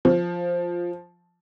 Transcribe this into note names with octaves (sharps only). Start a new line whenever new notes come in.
F3